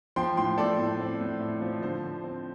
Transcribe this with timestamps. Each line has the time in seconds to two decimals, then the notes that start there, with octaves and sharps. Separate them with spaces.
0.16 F3 G5 C6
0.37 A2 G5 C6
0.58 A2 A4 D5
0.79 A2
1.00 C4
1.20 A2
1.40 A2
1.61 F3
1.82 D3 C5
2.03 D3
2.24 C4